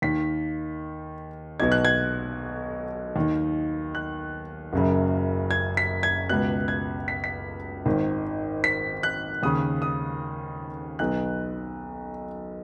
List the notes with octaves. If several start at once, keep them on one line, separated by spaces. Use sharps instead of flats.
D#2 D#3 B6
B1 B2 G#6
F#6
G#6
D#2 D#3
F#6
F#1 F#2 C#3
G#6
B6
G#6
C#2 B2 F#6
G#6
B6
B6
G#1 G#2 D#3
B6
F#6
D#2 C#3 D#6
D#6
B1 B2 F#6